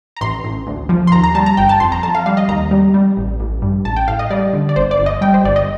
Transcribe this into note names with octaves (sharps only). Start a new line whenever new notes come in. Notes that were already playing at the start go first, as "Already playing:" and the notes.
A#5
A1 C6
A1
D2
F3
C6
D#2 A#5
A#5
G3 A5
A#5
G1 G5
A5
F2 C6
A#5
F2 A5
F5
G3 F5
D#5
D#2 A#5
G3
G3
A1
A1
G2
A1 A5
G5
A2 F5
D#5
G3 D5
D3
D5
G1 C5
D5
G1
D#5
G3 G5
C5
G1 D5
D#5